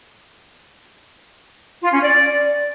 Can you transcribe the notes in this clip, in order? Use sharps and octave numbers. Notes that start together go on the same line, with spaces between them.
F4
C#4
D5